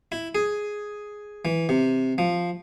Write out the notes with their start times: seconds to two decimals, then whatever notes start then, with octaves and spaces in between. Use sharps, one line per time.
0.12 E4
0.35 G#4
1.45 E3
1.69 C3
2.18 F3